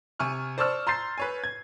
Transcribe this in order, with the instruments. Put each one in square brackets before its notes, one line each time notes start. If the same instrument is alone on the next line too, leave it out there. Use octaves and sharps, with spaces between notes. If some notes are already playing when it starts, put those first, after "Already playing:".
[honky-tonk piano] C3 G#5 C#6 F6
C5 D5 A5 C#6 E6 F6
A#5 C6 G6 A6 C7
B4 C#5 G#5
G#6